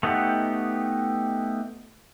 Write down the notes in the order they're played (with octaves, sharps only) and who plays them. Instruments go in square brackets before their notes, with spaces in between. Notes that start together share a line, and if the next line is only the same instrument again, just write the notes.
[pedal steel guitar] A3 B3 D#4 G4 F#5